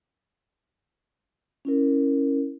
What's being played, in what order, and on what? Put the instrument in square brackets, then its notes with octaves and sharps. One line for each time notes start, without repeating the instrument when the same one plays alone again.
[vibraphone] C#4 E4 A#4